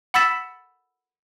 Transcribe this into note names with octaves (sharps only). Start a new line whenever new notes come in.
F#5 B5 E6 A6 B6 E7